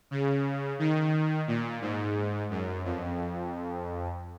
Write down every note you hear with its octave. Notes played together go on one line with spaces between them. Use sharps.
C#3
D#3
A#2
G#2
F#2
F2